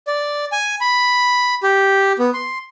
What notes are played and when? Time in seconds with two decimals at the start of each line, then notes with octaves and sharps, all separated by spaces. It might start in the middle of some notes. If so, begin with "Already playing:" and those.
0.07 D5
0.52 G#5
0.81 B5
1.63 G4
2.19 B3
2.34 C6